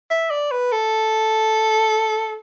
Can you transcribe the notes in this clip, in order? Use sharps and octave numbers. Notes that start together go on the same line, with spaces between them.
E5
D5
B4
A4